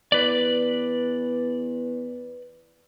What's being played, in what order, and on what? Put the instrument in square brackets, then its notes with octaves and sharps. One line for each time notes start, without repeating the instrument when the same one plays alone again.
[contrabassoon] E2 [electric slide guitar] B4 D5